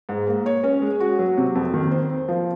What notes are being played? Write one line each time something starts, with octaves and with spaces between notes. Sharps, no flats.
G#2
A#3
C#5
C#4
G#3
F#4
F#3
C3
F2
D#3
C5
C4
F3